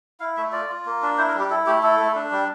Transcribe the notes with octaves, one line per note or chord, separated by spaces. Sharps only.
E4 F5
A3 E5
F4 D5
F4
A#3
D4
E4 C5
A#4
G3
G4
E4 A4
A3 G4
E4 A4
A3
D4
G3